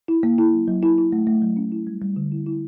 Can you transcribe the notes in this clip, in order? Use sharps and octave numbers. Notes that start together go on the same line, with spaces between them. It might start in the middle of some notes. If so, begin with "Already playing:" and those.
E4
A#3
E4
F#3
F#3
E4
E4
A3
A3
F#3
C#4
E4
G3
G3
D3
E4
E4